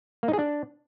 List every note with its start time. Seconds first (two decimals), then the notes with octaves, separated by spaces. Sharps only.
0.23 A#3
0.28 D#4
0.33 G#4
0.39 D4